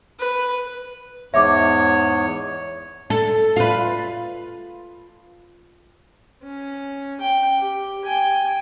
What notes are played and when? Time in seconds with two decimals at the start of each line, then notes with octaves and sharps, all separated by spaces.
0.20 B4
1.34 E2 G#2 C#5 E5 D6
3.10 A4
3.56 F4 B4
6.42 C#4
7.20 G5
7.58 G4
8.05 G5 G#5